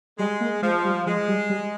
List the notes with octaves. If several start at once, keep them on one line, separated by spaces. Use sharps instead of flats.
G3 G#3
A#3
F3 G#3
G3
F3 G#3
G3
G3